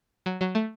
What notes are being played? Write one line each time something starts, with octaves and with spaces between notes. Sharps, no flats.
F#3
F#3
A3